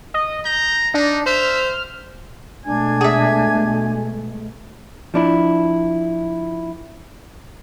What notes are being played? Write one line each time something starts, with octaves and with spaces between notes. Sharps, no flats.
D#5
A#5 G6
D4 D#4
C5 E5 F6
B2 G#3 A3 D4 G#5 G#6
G#4 E5
F3 D4 E4